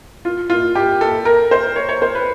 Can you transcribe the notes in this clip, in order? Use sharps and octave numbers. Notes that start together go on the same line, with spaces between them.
F4
F4
G4
A4
A#4
C5
C#5
C#5
C5
B4